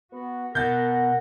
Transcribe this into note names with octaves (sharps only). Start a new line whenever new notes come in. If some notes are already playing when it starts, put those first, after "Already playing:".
B3 F#4
B2 A#4 F#5 G6 A6